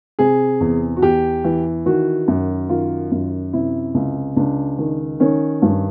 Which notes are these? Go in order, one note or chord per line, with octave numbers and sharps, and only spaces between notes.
C3 G#4
E2
F#4
E2 G4
E3
D#3 F#4
F#2
D#3 F4
F#2
C3 E4
C#2
C#2 D4
D#3
D#3 C#4
G2